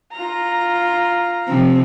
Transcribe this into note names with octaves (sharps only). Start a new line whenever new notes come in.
F4 A#5
C3 F3 C4